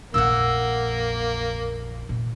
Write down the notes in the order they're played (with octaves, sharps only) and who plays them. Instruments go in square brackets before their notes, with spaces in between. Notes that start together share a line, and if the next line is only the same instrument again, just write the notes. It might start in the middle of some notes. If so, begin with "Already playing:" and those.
[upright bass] A#1 F2 [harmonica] A#3 [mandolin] F#5 E6
[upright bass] A#2